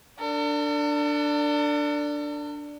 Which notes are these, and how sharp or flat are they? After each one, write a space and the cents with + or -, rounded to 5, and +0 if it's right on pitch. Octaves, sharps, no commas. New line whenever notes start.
D4 +0 A4 +45